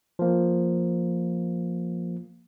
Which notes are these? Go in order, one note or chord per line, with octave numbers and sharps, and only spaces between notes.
F3 A#3